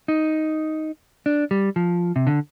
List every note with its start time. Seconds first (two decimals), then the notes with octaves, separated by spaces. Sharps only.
0.08 D#4
1.26 D4
1.51 G3
1.76 F3
2.16 C3
2.27 D3